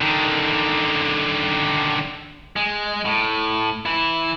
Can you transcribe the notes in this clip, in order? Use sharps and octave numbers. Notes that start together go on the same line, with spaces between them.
D3 D#3
G#3
A2
E3 E4